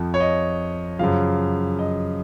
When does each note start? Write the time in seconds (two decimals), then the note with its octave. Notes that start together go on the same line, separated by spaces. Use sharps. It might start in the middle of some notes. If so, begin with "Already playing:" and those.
Already playing: F2 F3
0.14 C#5
0.20 D#5
0.99 F#2 C#3 F3 F5
1.79 D#5